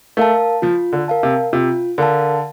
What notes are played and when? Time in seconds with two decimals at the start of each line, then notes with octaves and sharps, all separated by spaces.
0.17 A3 A#4 F5 A5
0.62 F3 F4
0.93 D3
1.08 A#4 F5 A5
1.23 C3
1.53 C3 F4
1.98 D3 A#4 F5 A5